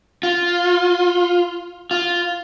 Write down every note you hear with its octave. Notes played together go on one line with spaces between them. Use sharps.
F4
F4